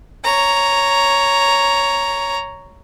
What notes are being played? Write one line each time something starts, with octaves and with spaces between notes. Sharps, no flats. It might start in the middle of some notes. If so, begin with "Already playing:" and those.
C#5 A#5